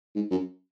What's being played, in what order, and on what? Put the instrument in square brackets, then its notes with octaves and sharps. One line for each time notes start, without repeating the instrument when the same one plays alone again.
[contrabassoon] G#2
F#2